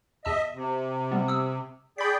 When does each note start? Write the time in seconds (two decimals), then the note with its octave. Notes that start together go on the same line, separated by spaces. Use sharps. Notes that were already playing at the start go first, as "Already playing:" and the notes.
0.25 E2 D#5 E5 A5 E6
0.54 C3
1.12 G3 B3
1.28 D#6 E6
1.98 G#4 D5 G5 B5 B6